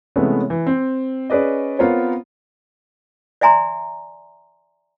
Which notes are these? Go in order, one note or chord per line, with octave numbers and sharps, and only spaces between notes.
C3 E3 G#3 A3 B3 C#4
E3
C4
C#4 G#4 B4 D5 D#5
B3 C4 F4 A#4 C5 C#5
D5 E5 G#5 A#5 C6